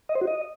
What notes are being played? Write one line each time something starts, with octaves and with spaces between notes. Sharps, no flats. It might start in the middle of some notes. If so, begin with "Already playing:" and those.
D#5
C5
F#4
D#5